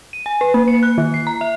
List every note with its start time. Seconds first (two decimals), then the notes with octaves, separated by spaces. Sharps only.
0.13 D#7
0.26 G#5
0.41 B4
0.54 A#3
0.68 C#7
0.83 F#6
0.98 D#3
1.14 C7
1.27 A#5
1.41 E5